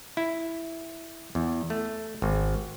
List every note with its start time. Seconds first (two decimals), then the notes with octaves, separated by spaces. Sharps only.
0.17 E4
1.35 E2
1.70 A3
2.22 G#1